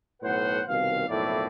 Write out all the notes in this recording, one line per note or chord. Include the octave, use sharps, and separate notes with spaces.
B1 A2 B4 C5 F#5
C2 B2 D#3 F5
B1 F2 A2 A#3 E4 D5